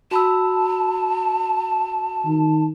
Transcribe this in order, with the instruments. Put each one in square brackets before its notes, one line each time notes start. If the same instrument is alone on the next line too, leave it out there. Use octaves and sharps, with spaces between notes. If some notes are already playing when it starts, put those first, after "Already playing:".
[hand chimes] F#4 B5 E6 [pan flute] A5
[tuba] D#3